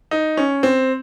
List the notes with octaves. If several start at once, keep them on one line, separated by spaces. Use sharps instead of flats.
D#4
C#4
C4